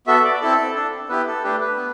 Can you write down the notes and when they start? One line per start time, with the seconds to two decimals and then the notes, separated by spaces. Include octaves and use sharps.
0.07 B3 F#4 A4 E5
0.24 D5
0.41 C4 E4 A4
0.75 D4 A4
1.09 B3 E4 G4 B4
1.27 A4
1.43 A3 D4 G4 B4
1.60 B4
1.77 B3